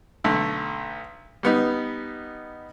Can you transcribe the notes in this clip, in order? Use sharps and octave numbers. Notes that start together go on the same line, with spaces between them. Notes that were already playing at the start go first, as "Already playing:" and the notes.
B1 D3 A3
G3 B3 D#4